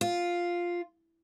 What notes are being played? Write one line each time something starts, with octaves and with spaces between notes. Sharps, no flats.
F4